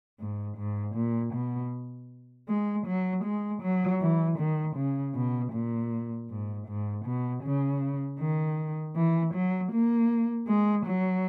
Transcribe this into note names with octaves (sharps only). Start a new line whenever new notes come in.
G#2
G#2
A#2
B2
G#3
F#3
G#3
F#3
E3
D#3
C#3
B2
A#2
G#2
G#2
B2
C#3
D#3
E3
F#3
A#3
G#3
F#3